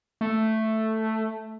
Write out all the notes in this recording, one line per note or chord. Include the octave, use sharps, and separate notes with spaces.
A3